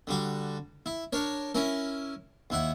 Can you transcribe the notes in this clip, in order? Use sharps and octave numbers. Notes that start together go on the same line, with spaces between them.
D3 G3 F#4
E4
D4 A#4 C#5
C#4 E4 A#4
D#2 E4 F#5